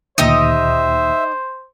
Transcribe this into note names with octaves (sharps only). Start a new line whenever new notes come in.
D2 A#2 D#3 D#4 G4 C5 D#5 E5